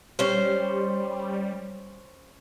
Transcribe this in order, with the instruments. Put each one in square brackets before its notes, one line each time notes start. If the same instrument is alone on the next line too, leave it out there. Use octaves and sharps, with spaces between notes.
[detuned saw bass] G3 [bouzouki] C#4 C5